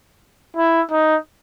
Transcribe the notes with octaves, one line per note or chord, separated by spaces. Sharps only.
E4
D#4